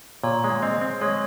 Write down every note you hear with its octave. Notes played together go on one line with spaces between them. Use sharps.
A#2 C#5
G#3
C4 D#5
C4
G#3 C#5